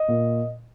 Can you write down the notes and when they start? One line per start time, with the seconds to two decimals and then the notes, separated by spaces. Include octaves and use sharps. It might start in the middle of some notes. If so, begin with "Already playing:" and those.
Already playing: D#5
0.08 A#2